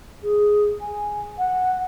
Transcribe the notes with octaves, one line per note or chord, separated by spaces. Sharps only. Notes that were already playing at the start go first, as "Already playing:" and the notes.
G#4
G#5
F#5